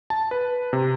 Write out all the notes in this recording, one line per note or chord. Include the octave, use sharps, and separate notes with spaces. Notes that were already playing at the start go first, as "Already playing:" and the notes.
A5
B4
C3